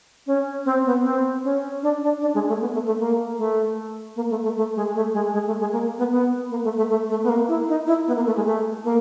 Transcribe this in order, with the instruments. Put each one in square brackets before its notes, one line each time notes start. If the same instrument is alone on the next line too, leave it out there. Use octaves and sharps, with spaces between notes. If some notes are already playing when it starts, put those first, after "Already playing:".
[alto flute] C#4
C4
B3
C4
C#4
D4
D4
D4
G#3
A3
B3
A3
A3
A#3
A3
A#3
A3
A3
A3
G#3
A3
G#3
G#3
A3
G#3
A#3
B3
B3
A#3
A3
A3
A3
A3
B3
A#3
E4
D#4
E4
B3
A#3
A3
G#3
A3
A#3